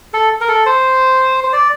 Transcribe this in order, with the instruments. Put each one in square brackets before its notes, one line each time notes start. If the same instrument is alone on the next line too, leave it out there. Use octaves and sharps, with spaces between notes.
[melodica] A4
A#4
A4
C5
C5
D5